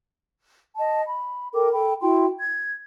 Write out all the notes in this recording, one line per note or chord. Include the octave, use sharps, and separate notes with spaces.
D#5 A5
B5
A4 A#4 G5 D6
A4 G5 B5
E4 F#4 G5 C6
G#6